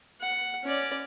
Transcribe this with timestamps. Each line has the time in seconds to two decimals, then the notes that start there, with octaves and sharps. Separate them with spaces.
0.22 F#5
0.64 C#4 D5